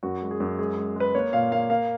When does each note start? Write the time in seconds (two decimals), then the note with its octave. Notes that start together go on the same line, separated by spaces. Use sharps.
0.03 F#2 F#4
0.22 G#3
0.31 G#4
0.40 F#2
0.59 G#3 G#4
0.77 G#3
0.96 G#3 B4
1.14 A#3 C#5
1.33 A#2 F5
1.51 A#3 F5
1.70 A#3 F5